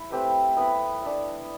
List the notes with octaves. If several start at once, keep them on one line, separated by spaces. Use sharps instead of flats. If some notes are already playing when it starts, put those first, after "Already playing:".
Already playing: E4
A3 C4 G4 B4
F#3 B3 E4 B4
D4 A4 E5